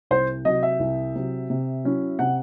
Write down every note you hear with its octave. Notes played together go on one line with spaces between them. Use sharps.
C2 C5
C3 F#3 D#5
E5
C2
C3 F#3
C3
F#3 C#4 E4
C3 F#5